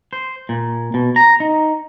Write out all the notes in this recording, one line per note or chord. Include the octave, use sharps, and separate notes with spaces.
C5
A#2
B2
A#5
D#4